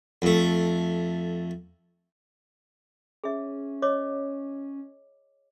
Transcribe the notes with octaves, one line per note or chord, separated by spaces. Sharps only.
F2 A3
C#4 G#4 E5
C#5 D#5 D6